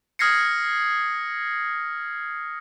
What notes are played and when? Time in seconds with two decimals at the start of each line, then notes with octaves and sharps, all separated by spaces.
0.19 D#6 F6 G#6 A#6 C7 C#7